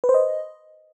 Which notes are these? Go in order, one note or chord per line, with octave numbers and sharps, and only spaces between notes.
B4
C5
D#5